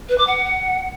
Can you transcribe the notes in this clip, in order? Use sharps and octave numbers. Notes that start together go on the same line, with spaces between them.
B4
D6
F#5